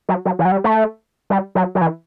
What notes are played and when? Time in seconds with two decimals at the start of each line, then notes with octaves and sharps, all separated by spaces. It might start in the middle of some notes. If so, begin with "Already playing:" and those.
0.09 F#3
0.25 F#3
0.39 E3
0.45 F#3
0.52 G3
0.64 A3
1.30 G3
1.55 F#3
1.75 F#3
1.81 E3